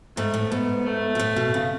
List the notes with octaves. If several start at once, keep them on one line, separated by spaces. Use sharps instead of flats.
G#2 A3
A2
G#2 B3
A3
B2
A2
B2
C#3